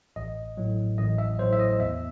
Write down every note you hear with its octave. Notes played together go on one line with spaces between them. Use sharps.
A1 D#5
A2 F#3
A1 D#5
E5
A2 F#3 C5
E5
D#5
E2 E5